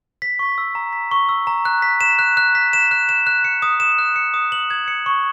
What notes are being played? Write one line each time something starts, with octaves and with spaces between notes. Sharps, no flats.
B6
C#6
E6
A#5
B6
C#6
E6
A#5
F#6
B6
E7
F#6
F#6
B6
E7
F#6
E7
F#6
C#7
D#6
E7
F#6
C#7
D#6
F#7
G#6
C#7
C#6